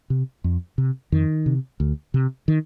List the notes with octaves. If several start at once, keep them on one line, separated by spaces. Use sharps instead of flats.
C3
F2
C3
F2 D#3
C3
D2
C3
D#3